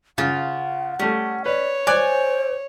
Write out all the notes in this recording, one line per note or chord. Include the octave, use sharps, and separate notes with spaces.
C#3 F4 F#5
G3 A3 C#4
B4 C#5 D5
C5 D5 G#5 D6 F#6